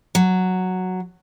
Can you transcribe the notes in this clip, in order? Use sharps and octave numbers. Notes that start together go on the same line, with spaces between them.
F#3